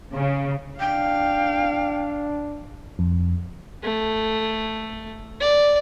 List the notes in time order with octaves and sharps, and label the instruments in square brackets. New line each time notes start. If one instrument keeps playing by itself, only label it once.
[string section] C#3
[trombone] D4 [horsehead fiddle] F5 [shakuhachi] G5
[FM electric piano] F2
[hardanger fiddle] A3
D5